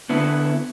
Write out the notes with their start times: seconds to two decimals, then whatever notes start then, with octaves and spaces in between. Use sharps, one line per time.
0.09 D3 B3 E4